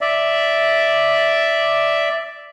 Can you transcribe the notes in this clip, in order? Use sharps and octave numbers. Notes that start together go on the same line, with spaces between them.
D5 E5